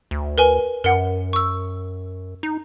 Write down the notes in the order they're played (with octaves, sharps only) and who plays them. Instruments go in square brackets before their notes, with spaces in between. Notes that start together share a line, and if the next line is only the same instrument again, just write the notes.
[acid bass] D2
[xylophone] A#4 B4 G#5
[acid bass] F#2 [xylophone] A#4 F#5
[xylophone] C#6 E6
[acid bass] D#4